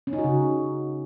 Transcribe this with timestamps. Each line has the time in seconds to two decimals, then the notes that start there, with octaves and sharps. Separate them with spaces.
0.07 C#4
0.13 D#4
0.18 F#4
0.24 C#3